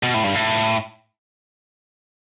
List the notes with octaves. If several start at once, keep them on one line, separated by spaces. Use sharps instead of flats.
B2
A2
G2
A2